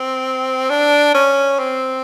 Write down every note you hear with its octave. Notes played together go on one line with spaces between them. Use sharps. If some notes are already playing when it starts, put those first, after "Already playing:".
Already playing: C4
D4
C#4
C4